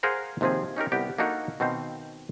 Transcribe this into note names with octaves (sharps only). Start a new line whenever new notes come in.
G#4 A#4 C5 F5 F#5 A#5
D#2 C3 F3 C4 G#4
C#4 D#4 G4 A#4
C2 B3 G4 G5
A#3 D4 D#4 F#4 A4 A#4
B2 D#3 C4 D#4 C5 F5